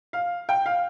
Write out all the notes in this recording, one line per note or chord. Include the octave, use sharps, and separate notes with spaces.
F5
G5
F5